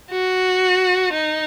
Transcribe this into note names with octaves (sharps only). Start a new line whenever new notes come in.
F#4
D#4